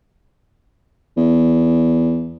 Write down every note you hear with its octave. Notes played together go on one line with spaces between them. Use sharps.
E2